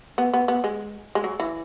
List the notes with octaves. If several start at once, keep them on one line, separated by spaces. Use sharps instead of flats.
B3
B3
B3
G#3
G#3
F#3
E3